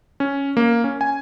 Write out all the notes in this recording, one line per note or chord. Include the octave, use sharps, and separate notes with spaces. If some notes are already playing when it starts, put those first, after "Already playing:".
C#4
A#3
C#4
G#5